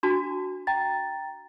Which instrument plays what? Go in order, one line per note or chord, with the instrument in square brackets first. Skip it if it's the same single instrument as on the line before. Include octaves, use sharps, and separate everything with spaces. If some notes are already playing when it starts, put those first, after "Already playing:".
[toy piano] D4 F#4 A5
[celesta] G5 A#5 A6